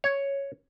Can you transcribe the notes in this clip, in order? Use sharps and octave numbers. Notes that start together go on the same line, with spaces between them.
C#5